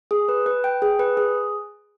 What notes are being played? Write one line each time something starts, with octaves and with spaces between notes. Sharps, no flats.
G#4
B4
B4
G5
G#4
B4
G#4